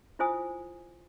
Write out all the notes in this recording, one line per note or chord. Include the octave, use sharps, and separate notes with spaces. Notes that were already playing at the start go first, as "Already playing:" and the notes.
E4 F4 C5 G#5 D#6